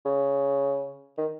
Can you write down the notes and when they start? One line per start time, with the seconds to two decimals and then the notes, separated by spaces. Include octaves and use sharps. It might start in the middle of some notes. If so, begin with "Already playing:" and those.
0.05 C#3
1.18 D#3